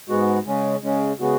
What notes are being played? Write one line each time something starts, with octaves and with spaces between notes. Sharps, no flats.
G#2 G#3 B3 F#4
C#3 G#3 C#4
C#3 G#3 C#4
C#3 G#3 B3 F#4